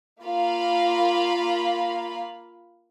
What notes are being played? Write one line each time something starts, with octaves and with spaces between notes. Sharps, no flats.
A#3 F4 F5 B5